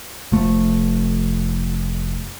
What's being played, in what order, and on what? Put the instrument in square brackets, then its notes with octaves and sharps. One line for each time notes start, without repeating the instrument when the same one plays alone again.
[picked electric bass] F1 F2 A3